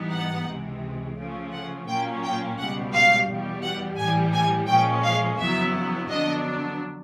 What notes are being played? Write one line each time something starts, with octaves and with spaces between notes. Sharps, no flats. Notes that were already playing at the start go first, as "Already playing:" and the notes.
Already playing: G#2 E3 G3 B3 D#4
F#5
C#2 C3 E3 G#3
C#3 F3 A3 C#4 F4
F#5
A#2 F#3 A#3 C#4 F4 G5
G5
C#2 B2 G3 F#5
F5
E2 B2 G3
F#5
A2 E3 G3 G#5
G#5
A#2 F3 G#3 C#4 G5
F5
F2 C#3 F#3 B3 E4 E5
F2 D3 F#3 B3 D4 D#5